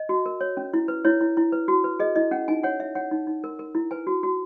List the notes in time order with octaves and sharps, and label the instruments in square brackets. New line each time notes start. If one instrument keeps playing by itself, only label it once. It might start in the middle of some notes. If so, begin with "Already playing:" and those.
Already playing: [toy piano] D#5
F#4
A#4
C#5
C#4
E4
B4
E4 C#5
E4
E4
B4
F#4
B4
G#4 D#5
E4 D#5
C#4 F#5
D#4 G#5
C#5 F#5
C#5 E5
C#5 F#5
D#4
D#4
A#4
A#4
E4
B4 G#5
F#4
F#4